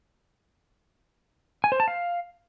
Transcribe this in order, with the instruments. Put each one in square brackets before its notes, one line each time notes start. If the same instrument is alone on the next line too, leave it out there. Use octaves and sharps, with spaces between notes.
[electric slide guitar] G#5
C5
A5
F5